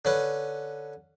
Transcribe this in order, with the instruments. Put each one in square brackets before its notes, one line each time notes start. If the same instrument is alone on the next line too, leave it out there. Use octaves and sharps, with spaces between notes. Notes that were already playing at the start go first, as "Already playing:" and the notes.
[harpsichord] D3 C#4 B4